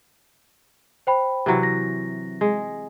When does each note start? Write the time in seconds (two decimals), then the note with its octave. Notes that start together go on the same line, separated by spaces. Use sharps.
1.07 C5 G5 B5
1.46 C3 E3 F#3
1.63 A#6
2.41 G#3